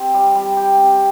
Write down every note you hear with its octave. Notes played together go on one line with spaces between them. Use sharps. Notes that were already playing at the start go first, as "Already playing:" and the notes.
Already playing: C4 G4
G3
G3
G4
C4